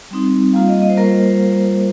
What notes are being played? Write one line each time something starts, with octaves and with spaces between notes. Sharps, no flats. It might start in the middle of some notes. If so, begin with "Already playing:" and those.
G3 C4 D#4
G3 A#3 F4 F5
D#5
D#5
C5
G3 A#3 F4 A#4
C5